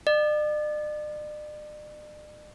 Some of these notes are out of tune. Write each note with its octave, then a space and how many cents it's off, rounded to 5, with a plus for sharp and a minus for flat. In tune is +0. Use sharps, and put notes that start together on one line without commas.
D5 +45